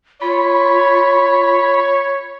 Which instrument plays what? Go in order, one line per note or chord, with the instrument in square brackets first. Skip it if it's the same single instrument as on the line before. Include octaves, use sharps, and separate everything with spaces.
[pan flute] F4 [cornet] C#5 [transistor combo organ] B5